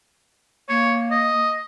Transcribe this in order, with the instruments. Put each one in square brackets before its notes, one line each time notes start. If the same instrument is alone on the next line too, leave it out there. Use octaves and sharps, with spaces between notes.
[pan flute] A#3 [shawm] C#5
[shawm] D#5